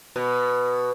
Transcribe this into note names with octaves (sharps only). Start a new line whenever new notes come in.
B2